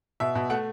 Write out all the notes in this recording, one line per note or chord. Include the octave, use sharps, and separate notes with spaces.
B2 E5
B2
A3 F#5